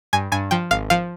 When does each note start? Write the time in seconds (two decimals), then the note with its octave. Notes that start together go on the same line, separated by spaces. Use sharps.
0.13 G2 G#5
0.32 G2 G#5
0.51 F3 G5
0.71 G#1 F5
0.90 F3 F5